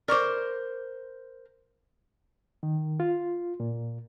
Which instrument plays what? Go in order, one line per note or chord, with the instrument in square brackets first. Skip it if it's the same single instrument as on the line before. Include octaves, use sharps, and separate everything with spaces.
[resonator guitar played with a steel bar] A#4 C5 [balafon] D5 C#6 D6
[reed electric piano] D#3
F4
A#2